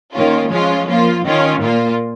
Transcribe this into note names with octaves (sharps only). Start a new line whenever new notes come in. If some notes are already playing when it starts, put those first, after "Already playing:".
D#3 A#3 C#4 F4
F3 G#3 C#4 F4
F3 A#3 F4
D#3 C#4 F4
A#2 A#3 F4